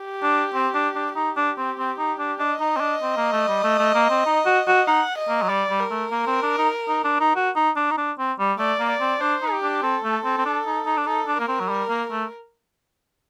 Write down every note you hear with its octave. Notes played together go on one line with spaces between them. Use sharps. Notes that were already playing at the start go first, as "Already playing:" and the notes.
Already playing: G4
D4
C4
D4
D4
D#4 G4
D4
C4
C4
D#4
D4
D4 D#5
D#4
C4
D4
C4
A#3
A3
G3
A3
A3
A#3
C4
D#4
F#4
F#4
D#4 F#5
D#5
A#3
F#3
G3 D5
G3
A#4
A3
A#3
C4
D4
D#4
D#4
D4
D#4
F#4
D#4
D4
D#4
D4
C4
G3
A3 D5
A#3
D5
C4
D4 C5
D#4
G4
D4
C4 A4
A3
C4
C4
D4
D#4
D#4
D4
D#4 A4
D4
A#3 A#4
C4
F#3
G3
A#3
A3